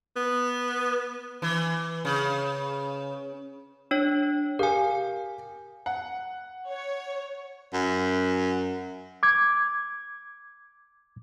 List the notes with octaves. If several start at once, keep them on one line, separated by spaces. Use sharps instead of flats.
B3
E3
C#3
D4 C#5
G4 A#4 F5 G#5
F#5
C#5
F#2
D6 G#6